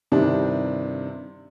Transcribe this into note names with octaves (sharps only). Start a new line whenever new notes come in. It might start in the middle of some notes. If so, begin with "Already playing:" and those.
G2 C3 D#3 D4 E4